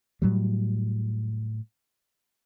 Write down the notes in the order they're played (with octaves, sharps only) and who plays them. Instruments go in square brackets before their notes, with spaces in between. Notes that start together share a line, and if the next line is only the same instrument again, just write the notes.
[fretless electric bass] A2 F#3 G3